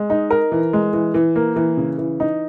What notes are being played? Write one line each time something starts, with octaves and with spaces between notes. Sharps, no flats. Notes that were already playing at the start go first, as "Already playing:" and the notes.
Already playing: G#3
D#4
A#4
E3
G#3
E3
E3
A#3
E3
C#3
E3
D#4